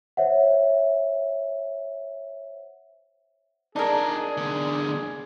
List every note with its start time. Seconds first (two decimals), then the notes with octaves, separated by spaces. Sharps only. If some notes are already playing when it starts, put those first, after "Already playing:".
0.17 C5 C#5 E5 F#5
3.76 D4 D#4 G#4 A#4 D5
4.37 E2 D3